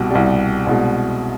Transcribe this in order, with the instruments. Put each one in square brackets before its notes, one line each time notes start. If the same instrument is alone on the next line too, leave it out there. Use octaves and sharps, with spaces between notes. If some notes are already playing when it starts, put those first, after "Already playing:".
Already playing: [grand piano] C2 B2 G3
C2 B2 G3
C2 B2 G#3